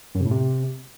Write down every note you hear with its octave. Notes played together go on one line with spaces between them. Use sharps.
F#2
C3
A2
C3